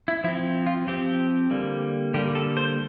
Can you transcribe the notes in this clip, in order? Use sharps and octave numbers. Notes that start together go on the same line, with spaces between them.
E4
F3 C4 E4
F4
F3 C4 G4
D3 G3 A#3
D3 G3 A#3 G4
A4
C5